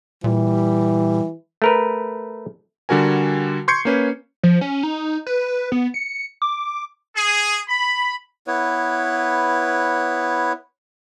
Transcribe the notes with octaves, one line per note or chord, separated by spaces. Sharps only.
A#2 E3 G3
A3 A#4 B4
D3 G3 F#4 A#4 G#5
C6 C#6 G6 G#6 C7 C#7
A#3 C#4 B4
F3
C#4
D#4
B4
B4
B3
C#7
D6
G#4
B5
B3 E4 B4 C#5